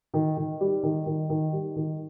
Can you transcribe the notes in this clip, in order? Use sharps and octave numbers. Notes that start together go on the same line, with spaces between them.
D#3
D#3
G3
D#3
D#3
D#3
G3
D#3